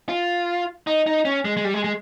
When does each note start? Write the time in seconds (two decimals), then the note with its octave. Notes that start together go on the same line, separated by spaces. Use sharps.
0.09 F4
0.87 D#4
1.07 D#4
1.25 C#4
1.45 G#3
1.57 G#3
1.64 G3
1.74 G#3
1.84 G#3